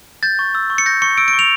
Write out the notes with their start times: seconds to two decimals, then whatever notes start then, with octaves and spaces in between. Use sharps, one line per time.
0.23 G6 A6
0.39 C#6
0.55 E6
0.70 C#6
0.78 C#7
0.86 G6 A#6
1.02 C#6 C#7
1.18 E6 D7
1.28 D7
1.33 C#6
1.39 F7